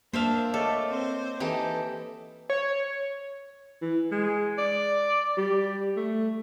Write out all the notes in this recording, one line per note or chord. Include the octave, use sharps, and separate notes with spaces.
A#3 D4 C5 E5 F5
A3 A4 C#5 D#5 D6
C4 C5
E3 D#4 G4 A4
C#5
E3
G#3
D5
G3
A3